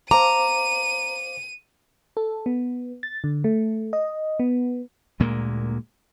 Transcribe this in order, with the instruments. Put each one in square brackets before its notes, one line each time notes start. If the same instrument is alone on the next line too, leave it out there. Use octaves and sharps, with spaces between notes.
[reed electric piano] C5 F5 D6 [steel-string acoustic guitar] A#5 [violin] D#7
[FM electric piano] A4
B3
A6
D3
A3
D#5
B3
[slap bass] D2 A#2 G#3 A#3